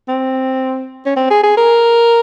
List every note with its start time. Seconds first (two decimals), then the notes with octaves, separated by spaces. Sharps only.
0.08 C4
1.06 C#4
1.16 C4
1.30 G#4
1.43 G#4
1.57 A#4